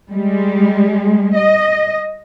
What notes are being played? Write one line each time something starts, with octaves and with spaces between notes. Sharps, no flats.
G3 G#3
D#5